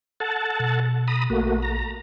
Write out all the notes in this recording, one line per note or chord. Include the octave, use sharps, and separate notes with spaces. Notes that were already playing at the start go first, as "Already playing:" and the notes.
A4 F#5 A5
B2
A#5 B5 D#6
A#1 A3 A#3 F#4
A#5